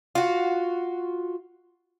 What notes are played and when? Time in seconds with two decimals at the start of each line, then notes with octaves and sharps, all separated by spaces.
0.15 F4 F#4